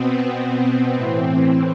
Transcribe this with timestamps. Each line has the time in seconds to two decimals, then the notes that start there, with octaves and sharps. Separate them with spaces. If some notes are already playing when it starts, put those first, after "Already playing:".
Already playing: B2 B3 C4
0.26 B3
0.96 A2 E3 C4